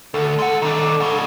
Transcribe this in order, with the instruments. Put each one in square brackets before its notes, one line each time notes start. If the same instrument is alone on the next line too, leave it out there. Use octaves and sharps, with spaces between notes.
[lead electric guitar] D2 [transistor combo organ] A4
[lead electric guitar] G#3 F#5
D#3 D4
G#2 C#3